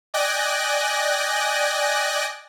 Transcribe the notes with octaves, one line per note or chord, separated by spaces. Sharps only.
D5 D#5 G5 G#5 F#6 A#6